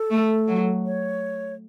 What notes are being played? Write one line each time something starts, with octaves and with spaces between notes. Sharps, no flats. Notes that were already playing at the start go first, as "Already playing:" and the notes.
Already playing: A4
A3
F#3
C#5